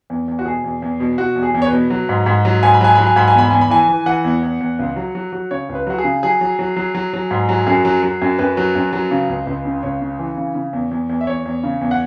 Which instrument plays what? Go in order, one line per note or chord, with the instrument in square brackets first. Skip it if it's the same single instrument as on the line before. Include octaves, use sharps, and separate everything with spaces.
[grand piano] E2
E2
F#4
B2 G#4
E2
E2
B2
B2 F#4
E2
G#4
E2
C#5
B4
B2
F#3
G#2
G#2
F#3
G#2 G#5
B5
F#3 G#5
F#3 B5
G#5
G#2 B5
G#5
E2 B5
E2 G#5
B5
E3 G#5
E3
E3 F#5
E2
E2
E2
C#2
F#3
F#3
F#3
C#3 C#5
C#2
B4
F#3 F#4
G#4
C#3
F#3 G#4
F#3
F#3
F#3
F#3
F#3
G#2
F#3
F#2 G#4
F#3
F#3
F#2
F#2 B4
F#3
F#2
F#3
C#3
C#2
C#2
C#3
C#2 C#5
C#3
E3
C#3
C#3
E2
E2
E2
E5
E2 C#5
E2
C#3
E2
F#5